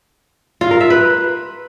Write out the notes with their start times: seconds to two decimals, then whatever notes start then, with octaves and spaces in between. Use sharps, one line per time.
0.61 F4
0.71 A#4
0.81 E5
0.90 B4